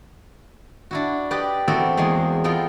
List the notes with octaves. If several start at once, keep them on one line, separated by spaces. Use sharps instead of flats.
D4 E4 F#4
G4 B4 D5 D#5
E3 B3 C4 F#4 A4 A#4
E2 G#3 A#3 C6
G#3 B3 F4 A4 A#4 G5